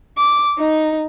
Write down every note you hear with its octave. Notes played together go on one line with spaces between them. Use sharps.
D6
D#4